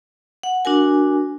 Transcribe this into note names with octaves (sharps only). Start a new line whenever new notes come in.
F#5
D4 F#4 A#4 G#5